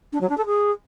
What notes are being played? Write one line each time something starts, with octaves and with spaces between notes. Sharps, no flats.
D4
F#3
D4
A4
G#4